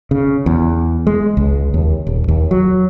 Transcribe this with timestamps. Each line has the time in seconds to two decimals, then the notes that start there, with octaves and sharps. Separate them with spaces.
0.11 C#3
0.46 E2
1.07 G#3
1.37 C#2
1.74 D#2
2.07 D#1
2.28 D#2
2.51 F#3